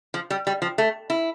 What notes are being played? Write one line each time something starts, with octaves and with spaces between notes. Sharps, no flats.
F3
G3
G3
F3
A3
E4